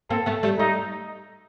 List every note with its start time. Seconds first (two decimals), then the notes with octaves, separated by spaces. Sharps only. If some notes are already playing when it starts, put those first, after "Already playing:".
0.10 A#3 C4 A4
0.26 A3 B3
0.43 G3 A3
0.59 G3 A3 D#4